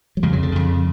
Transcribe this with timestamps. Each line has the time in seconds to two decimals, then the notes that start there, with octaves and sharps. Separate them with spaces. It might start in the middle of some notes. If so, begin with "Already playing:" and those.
0.17 F#3
0.23 F2 C#3 G#3
0.33 F#3
0.43 D3
0.52 F2 C#3